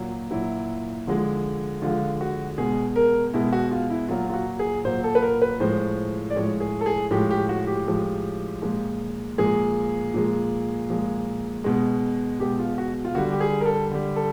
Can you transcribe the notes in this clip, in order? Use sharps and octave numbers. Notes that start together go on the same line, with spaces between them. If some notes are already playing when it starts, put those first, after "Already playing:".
Already playing: A#2 F#3
A#2 F#3 E4
D3 F3 G#3
D3 F3 G#3 F4
F#4
B2 G#3 G#4
A#4
B2 G#3 E4
F#4
F4
E4
A#2 F#3 F4
F4
F#4
G#4
A#2 F#3 C5
A4
B4
A#4
B4
A2 F3 G#3 C5
D5
A2 F3 G#3 C#5
G#4
A4
G#4
A2 F3 G#3 G4
G4
F#4
G4
A2 F3 G#3
A#2 F3 G#3
A#2 F3 G#3 G#4
A#2 F3 G#3
A#2 F3 G#3
B2 G#3
B2 G#3 G4
F4
F#4
F4
D3 G3 F#4
G4
G#4
A#4
A4
D3 G3
A4